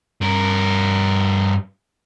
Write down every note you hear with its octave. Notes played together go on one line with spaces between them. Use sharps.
G2 A#4